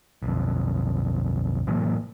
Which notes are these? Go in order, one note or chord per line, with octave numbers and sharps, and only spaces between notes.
B1 F2
A2 E3 F#3 A#3